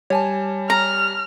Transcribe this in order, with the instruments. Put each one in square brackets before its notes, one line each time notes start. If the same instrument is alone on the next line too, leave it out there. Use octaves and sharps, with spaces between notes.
[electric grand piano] G3 [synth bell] C#5 G#5 A5
[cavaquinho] A#5 [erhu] F6